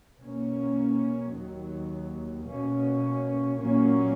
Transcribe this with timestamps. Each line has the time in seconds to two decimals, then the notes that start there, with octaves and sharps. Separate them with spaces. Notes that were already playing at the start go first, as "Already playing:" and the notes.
0.19 B2 A#3 C#4
1.31 D#2 D#3 F#3
2.44 B2 A#3 C#4
3.57 A#2 F#3 A#3 C#4